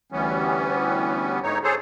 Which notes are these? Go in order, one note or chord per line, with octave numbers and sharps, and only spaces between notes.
D2 E3 G3 B3 C#4
G#2 A3 D#4 C#5
G#4 A4 C5 C#5